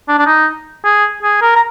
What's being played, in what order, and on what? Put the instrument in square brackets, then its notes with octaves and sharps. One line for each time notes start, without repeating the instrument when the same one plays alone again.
[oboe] D4
D4
D#4
G#4
G#4
A#4
A#5